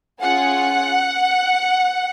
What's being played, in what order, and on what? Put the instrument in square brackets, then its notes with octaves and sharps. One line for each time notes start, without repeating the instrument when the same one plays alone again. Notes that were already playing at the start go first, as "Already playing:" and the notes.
[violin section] C#4 F4 G#4 F#5